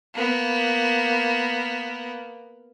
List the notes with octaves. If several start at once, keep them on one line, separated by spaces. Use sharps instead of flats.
A#3 B3